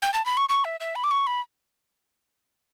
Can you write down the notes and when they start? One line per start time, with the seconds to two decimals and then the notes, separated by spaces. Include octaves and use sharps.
0.02 G5
0.14 A5
0.26 B5
0.37 C#6
0.49 C#6
0.65 E5
0.80 E5
0.95 B5
1.04 D6
1.11 C#6
1.27 B5